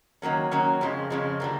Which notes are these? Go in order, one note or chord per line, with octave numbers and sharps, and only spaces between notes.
D#3 F#3 A#3 C#4
D#3 F#3 A#3 C#4
F2 C#3 F3 G#3
F2 C#3 F3 G#3
D3 G3 A#3